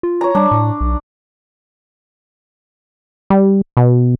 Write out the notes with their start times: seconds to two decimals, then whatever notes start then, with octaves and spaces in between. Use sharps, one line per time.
0.03 F4
0.21 C#5 A#5
0.35 G3 D4
0.51 A2
0.81 B1
3.30 G3
3.77 B2